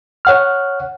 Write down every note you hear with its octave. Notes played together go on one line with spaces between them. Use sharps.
C#5 F#5 F6